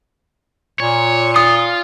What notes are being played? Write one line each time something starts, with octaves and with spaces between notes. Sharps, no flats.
A#2 C#5
F4 D#6